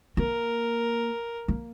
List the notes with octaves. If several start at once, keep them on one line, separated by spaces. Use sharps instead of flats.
A#3 A#4
A#3